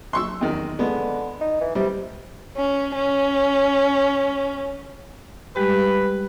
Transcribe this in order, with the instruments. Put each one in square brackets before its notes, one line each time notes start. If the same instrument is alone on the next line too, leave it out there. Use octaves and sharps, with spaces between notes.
[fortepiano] C6 C#6 E6
E2 D#3
[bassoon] D3 [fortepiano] G#3 B3
[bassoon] D#4
E3
[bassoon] C3 [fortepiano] G3
[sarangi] C#4
C#4
[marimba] G3 G#3 G4 [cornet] B4